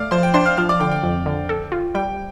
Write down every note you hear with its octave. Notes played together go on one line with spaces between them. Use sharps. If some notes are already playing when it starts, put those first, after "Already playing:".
Already playing: A3 D5 F5 D6 F6
F3 C5 C6
G5
D4 C5 C6
F5 F6
F3 F5 F6
D5 D6
D3 G5
G5
F2
D3
A4
F4
G3 G5